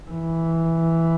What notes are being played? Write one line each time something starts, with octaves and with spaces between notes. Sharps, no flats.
E3